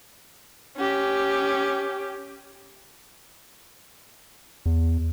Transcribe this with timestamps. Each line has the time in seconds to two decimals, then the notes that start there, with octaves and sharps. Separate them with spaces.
0.77 C#4 G4
4.66 E2